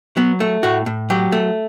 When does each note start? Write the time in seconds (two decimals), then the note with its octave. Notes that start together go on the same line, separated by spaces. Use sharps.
0.17 F#3 B3
0.40 A3
0.63 A2 F#4
0.86 A2
1.10 F#3 G4
1.32 A3